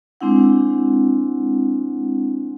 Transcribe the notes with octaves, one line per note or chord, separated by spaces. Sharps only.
G#3 C4 D4 E4 F#5